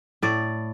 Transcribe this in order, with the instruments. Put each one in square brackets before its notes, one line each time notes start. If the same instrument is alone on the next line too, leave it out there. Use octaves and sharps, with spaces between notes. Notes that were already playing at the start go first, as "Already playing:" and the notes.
[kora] A2 D5